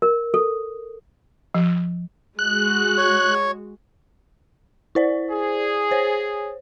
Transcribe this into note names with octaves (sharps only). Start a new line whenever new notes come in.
A#4
A4
F3
G#3 F#4 F#6
C#5
E4 C5 D5
G#4
C5 C#5